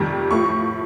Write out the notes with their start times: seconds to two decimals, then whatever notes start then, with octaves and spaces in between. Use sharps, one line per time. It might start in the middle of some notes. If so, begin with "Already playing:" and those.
Already playing: F2 C3 D#3 G3
0.31 A2 F3 A3 C#6